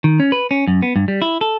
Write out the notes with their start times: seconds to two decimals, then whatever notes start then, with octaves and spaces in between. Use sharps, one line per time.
0.04 D#3
0.20 C#4
0.32 B4
0.51 C#4
0.68 F#2
0.82 B3
0.96 G2
1.08 G3
1.22 E4
1.41 A4